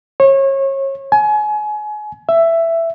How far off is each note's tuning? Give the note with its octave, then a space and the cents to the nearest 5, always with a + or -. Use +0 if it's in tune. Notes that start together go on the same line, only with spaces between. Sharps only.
C#5 -30
G#5 +30
E5 +10